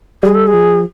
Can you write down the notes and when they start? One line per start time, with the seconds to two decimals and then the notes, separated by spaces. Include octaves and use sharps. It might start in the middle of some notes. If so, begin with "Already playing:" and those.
0.23 G3 G#4
0.35 A4
0.47 G#4
0.54 F3